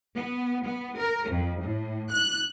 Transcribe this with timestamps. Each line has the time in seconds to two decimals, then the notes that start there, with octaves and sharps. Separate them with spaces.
0.16 B3
0.64 B3
0.98 A#4
1.28 F2
1.61 A2
2.12 F#6